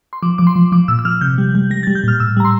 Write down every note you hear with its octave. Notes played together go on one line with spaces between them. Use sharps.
C6
F3 D6
F3 D6
C6
F3
F3 D6
A#2 E6
E6
F3 F6
C3 G6
G3
G3
G3 A#6
A6
G3
G6
A#2 F6
A2 E6
G3 A#5
C6